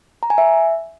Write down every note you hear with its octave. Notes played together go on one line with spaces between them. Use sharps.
A#5
G#5
E5